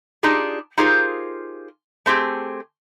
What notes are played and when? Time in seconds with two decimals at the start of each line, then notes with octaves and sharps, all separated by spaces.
0.23 D4 D#4 F4 G4 G#4
0.78 D#4 F4 G4 G#4 A#4 C5
2.06 A3 C4 G4 G#4